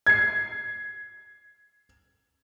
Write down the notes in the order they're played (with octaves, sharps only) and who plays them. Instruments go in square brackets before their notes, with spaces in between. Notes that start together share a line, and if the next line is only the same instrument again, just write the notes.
[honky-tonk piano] G#6 C7